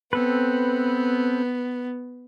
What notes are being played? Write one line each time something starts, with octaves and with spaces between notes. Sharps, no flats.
B3 C4 A4 B4